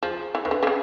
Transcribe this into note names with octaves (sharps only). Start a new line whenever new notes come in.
F3 G#4
E3
D#3 B4
D3
D3
C#3